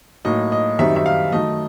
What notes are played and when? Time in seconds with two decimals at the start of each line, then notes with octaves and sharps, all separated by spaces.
0.25 A2 F#3 A#3 D#4 D#5
0.52 D#5
0.79 F#2 D#3 G3 C4 D#4 E5
0.96 E5
1.06 F5
1.32 D#3 F#3 A3 D#5